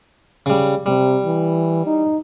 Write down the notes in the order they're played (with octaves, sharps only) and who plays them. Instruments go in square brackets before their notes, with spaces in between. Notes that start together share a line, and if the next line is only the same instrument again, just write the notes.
[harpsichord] C#3 G3
[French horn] C3 [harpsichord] G3
[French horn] E3
D#4